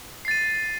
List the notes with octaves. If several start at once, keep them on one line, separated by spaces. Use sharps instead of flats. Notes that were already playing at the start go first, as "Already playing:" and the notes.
A6 C7 D#7